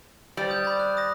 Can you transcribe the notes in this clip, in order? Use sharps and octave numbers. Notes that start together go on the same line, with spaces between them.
G3 C5 D5 G5
D#6 G6
B5 A6
F#6
D#6 A#6